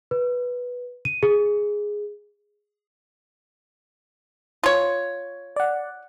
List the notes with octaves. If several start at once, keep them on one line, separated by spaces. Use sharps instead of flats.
B4
D#7
G#4
F4 C#5
D5 F#5